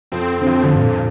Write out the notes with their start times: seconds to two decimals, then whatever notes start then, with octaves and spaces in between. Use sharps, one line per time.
0.12 F2 F3 C4
0.40 D3
0.46 F2 F3
0.64 F2 D3 F3
0.76 G2
0.81 A#2